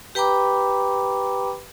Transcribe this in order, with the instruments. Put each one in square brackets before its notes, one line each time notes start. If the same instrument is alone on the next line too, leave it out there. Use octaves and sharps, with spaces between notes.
[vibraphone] G4 B4 G5 A#5 B5 D6